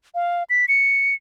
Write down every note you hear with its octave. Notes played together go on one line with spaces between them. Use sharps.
F5
B6
C#7